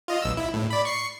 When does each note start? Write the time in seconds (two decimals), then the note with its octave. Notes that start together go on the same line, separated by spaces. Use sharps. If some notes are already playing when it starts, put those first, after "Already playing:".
0.08 F4 D#5
0.22 B1 E6
0.37 E4
0.54 A2
0.71 D5 B5
0.85 C#6 C7 C#7